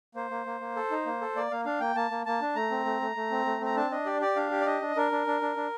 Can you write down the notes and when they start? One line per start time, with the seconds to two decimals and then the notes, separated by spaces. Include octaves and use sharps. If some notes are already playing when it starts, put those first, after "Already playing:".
0.15 A#3 C5
0.31 A#3
0.46 A#3
0.61 A#3
0.76 A4
0.91 D#4
1.06 A#3
1.21 A4
1.36 A#3 D5
1.51 A#3 F5
1.65 D4 F5
1.80 A#3 G5
1.95 A#3 A5
2.11 A#3
2.26 A#3 A5
2.41 D4
2.55 A3 A#5
2.71 C4
2.86 A3
3.01 A3
3.16 A3
3.31 C4
3.45 A3
3.61 C4 A#5
3.76 D4 A5
3.91 D4 D#5
4.06 G4 D5
4.21 G4 D5
4.36 D4 F5
4.51 G4
4.61 D5
4.66 D4 D#5
4.82 D4
4.96 D4 A#4
5.12 D4
5.27 D4
5.41 D4
5.56 D4